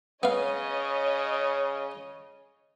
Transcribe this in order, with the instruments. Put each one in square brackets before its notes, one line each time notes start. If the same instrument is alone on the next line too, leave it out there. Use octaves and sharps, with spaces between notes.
[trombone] C#3 [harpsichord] B3 F5 [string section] C#5 D#5